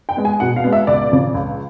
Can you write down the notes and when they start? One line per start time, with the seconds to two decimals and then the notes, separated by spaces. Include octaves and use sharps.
0.09 G5
0.17 G#3 B3
0.25 G#5
0.40 B2 F#5
0.56 F5
0.64 G#3 B3
0.73 E5
0.87 C#2 D5
1.12 C#3 F3
1.34 C#2